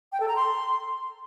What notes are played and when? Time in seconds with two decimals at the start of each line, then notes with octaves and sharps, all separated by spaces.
0.12 G5
0.20 A4
0.28 A#5
0.36 C6